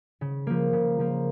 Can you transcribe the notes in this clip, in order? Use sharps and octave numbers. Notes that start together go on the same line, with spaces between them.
C#3
F3 A#3
C#3
F3 A#3